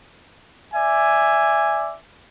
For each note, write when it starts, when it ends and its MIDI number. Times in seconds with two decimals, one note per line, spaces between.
0.74 1.96 74
0.74 1.96 76
0.74 1.96 80